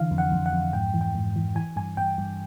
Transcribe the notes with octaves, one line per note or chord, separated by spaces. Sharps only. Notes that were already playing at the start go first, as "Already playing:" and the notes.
Already playing: D3 E3 F5
F2
F#5
F2
F#5
F2
G#2 G5
E3
G5
G#2
E3
E3 G#5
G2 G#5
G2 G5
G2